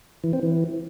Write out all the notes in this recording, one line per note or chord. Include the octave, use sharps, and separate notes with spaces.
E3
C4
E3